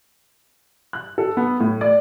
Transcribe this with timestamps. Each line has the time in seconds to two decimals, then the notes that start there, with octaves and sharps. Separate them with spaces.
0.93 F#6
1.18 A4
1.37 B3
1.60 A2
1.81 D5